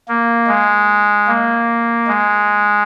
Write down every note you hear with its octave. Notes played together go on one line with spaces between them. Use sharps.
A#3
G#3
A#3
G#3